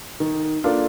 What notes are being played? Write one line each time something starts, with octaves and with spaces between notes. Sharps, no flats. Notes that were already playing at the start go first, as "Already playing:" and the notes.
D#3
A#3 D4 F4 A4